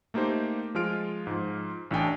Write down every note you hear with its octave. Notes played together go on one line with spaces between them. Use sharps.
A3 A#3 D#4 G4 C5
F3 G#3 F4 F6 D7
G#2 F3
A1 A2 D4 G5 G#5